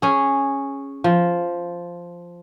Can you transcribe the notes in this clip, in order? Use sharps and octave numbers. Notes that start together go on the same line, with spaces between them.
C#4 G#4
F3